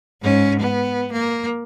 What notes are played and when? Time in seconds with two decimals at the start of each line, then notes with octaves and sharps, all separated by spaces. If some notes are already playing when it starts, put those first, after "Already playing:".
0.22 G#2 C#4
0.59 B3
1.12 A#3